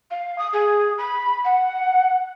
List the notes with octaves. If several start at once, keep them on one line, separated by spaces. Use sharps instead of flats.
F5
D#6
G#4
B5
F#5